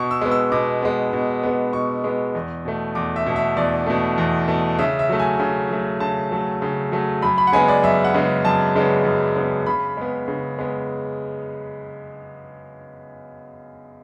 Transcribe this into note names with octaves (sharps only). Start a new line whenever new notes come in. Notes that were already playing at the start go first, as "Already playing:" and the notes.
Already playing: B2 C#6
E6
G#3 B3
E6
B2 D6
G#3 B3
B2
G#3 B3
B2 C#6
G#3 B3
E2
B2 A3
E2 D6
E5
B2 A3
E5
E2 D5
B2 A3
E2
B2 A3
C#3 E5
E5
F#3 A3
G#5
C#3
F#3 A3
C#3 A5
F#3 A3
C#3
F#3 A3
F#2 B5
B5
F#5
C#3 G#3 B3 G#5
D5
F#2 E5
F#5
C#3 G#3 B3
F#2 A5
C#3 G#3 B3
F#2
C#3 G#3 B3
C#3 B5
G#3 B3
C#3
G#3 B3